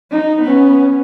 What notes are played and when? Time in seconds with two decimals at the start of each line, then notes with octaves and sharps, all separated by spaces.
0.11 D#4
0.41 B3 C#4